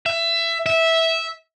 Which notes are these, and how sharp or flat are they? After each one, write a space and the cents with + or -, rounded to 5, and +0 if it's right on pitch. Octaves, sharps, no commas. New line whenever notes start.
E5 +20
E5 -10